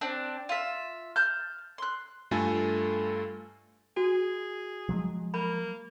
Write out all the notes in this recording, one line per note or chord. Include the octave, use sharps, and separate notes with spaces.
C4 D4 F#6
F4 E5
A5 F6 G6
C6 F#6
G2 A3 F4 A4 G#5 A6
F#4 G#4
F3 F#3 G#3
A#3 B5